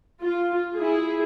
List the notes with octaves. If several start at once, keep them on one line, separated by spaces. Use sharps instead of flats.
F4
E4 G#4